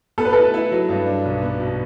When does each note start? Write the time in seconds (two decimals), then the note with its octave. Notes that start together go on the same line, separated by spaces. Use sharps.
0.18 B3 A4
0.25 B4
0.33 E4 A4
0.54 E4
0.72 F#3
0.89 G2
1.06 D4
1.25 B1
1.42 B3
1.60 B2